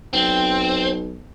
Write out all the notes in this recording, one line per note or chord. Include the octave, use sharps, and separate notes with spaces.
B1 C4